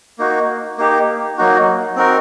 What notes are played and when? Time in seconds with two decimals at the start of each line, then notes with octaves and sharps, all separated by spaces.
0.18 A#3 D#4 F#4
0.78 A#3 D#4 G4
1.38 F#3 A#3 D#4 F#4
1.96 C4 D#4 F#4 A#4